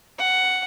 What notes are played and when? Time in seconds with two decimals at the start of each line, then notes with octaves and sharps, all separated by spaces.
0.19 F#5